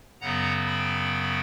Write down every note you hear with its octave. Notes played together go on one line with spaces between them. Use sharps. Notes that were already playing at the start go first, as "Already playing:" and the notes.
F#2 C#3 F#3 B3 F#5 A#5
G5 B5